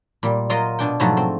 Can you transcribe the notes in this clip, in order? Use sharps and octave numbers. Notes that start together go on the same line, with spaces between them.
A#2 G3
F#3 F4 A#4 D#5 A#5 C6
B2 D4 G5
G#2 B2 F3 F#3 A3
C4